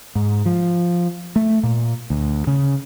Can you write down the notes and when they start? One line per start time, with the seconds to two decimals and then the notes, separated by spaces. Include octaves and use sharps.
0.15 G#2
0.46 F3
1.36 A3
1.63 A#2
2.10 D2
2.47 C#3